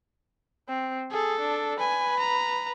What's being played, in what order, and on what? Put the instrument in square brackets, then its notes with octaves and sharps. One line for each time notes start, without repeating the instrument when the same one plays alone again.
[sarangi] C4
[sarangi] G#4 [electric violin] A4
[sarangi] D4
[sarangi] B4 [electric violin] G#5
[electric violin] A#5